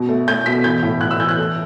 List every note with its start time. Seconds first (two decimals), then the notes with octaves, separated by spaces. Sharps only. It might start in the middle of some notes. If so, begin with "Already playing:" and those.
Already playing: B2
0.09 A3
0.27 A3 G6
0.46 B2 B6
0.64 E3 G6
0.83 A2
1.01 A2 F#6
1.11 E6
1.19 E3 G6
1.29 F#6
1.38 A3